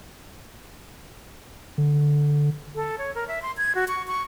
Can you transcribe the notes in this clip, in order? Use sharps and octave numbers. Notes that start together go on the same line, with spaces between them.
D3
A4
C#5
A#4
E5
C6
G#6
F#4
C#6
C#6